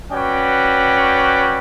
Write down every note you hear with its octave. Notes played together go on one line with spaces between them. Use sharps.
C#4 F#4 B4 D5 G5